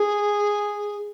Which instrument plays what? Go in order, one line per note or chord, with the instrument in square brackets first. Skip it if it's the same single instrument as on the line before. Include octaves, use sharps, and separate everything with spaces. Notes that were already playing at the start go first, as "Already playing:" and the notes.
Already playing: [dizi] G#4